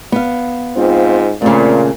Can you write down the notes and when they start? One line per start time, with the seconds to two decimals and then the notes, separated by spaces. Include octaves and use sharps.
0.12 B3 F5
0.77 G#2 C4 F4
1.42 A#2 C#3 A3 C4